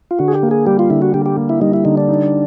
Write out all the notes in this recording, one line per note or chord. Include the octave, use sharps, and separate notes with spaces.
F4
D3 F#4
G#4
G4
A#3
G#4
G3 G4
F4
D3 E4
F#4
D3 G4
G4
A#3
E4
G3 D#4
E4
D3 D#4
D4
D#4